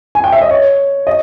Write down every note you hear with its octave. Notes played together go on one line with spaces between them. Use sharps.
G#5
G5
E5
D#5
C#5
D#5